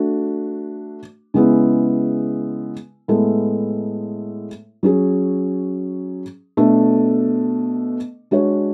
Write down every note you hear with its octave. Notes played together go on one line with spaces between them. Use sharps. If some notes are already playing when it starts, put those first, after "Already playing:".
Already playing: A3 D4 F#4
C#3 G#3 B3 E4
A2 G#3 B3 E4 A4
F#3 C#4 G#4
B2 A3 D4 A4
G#3 D4 F#4 C#5